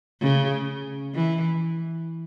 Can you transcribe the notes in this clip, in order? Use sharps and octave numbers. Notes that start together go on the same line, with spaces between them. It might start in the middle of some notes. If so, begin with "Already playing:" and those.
C#3
E3